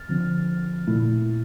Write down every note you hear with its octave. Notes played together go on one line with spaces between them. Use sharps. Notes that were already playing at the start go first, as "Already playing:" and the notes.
Already playing: F6 A6
D3 F3 C4
A#2 A3 E4